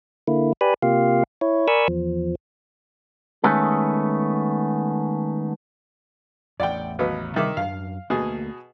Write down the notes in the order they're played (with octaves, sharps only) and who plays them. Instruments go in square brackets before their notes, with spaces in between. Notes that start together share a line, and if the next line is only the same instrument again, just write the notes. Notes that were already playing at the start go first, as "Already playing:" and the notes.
[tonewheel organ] D3 A#3 E4
G4 B4 D5 G#5 B5
C3 A#3 F4 G4 F5
E4 C#5
A#4 D5 G#5 B5 C#6 E6
E2 F3
[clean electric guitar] D#3 G#3 A3 B3 C#4 A4
[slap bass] A1 E2 [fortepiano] D5 F#5 G5
[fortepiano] D#2 F#3 B3
[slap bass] C3 G3 [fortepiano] D#3 E5 D6
[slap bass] F#2 D4 [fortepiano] F5
[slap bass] D2 A3 A#3 [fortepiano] B2 G#4